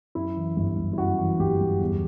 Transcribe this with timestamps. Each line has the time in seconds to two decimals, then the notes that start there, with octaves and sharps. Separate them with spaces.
0.15 F#2 E4
0.36 E3
0.57 G1
0.78 G1
0.93 E4
0.98 F#2 F#4
1.18 E3
1.40 G1 G4
1.60 G1
1.81 E2